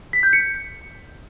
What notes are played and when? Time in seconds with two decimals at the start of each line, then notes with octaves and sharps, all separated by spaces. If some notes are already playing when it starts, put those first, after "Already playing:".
0.13 B6
0.23 G6
0.33 C#7